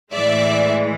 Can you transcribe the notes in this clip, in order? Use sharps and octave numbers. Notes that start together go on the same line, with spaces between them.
A2 E3 G#3 D5 E5